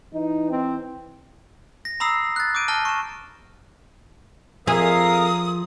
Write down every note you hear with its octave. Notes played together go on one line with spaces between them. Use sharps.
E3 D#4
C4
A#6
A#5 B5 D#6 E6 C7
F#6 A6
D6 G6 D7 D#7
A5 F6 A#6 D#7 G7
C#6 E7
F2 F3 G#4 A#4 E5 F5 D#6